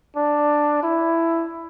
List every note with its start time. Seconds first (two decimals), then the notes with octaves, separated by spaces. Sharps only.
0.16 D4
0.83 E4